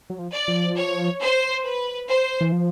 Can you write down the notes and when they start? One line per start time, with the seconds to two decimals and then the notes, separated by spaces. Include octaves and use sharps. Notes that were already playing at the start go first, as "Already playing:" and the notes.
0.10 F#3
0.19 F3
0.33 D5
0.48 F3
0.77 C#5
1.21 C5
1.65 B4
2.08 C5
2.41 E3
2.52 F3